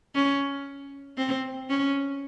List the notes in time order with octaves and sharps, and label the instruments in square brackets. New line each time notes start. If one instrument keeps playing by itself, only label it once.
[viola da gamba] C#4
C4
C#4